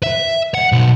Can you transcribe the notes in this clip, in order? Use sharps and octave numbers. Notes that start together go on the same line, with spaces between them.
E5
F#5
B1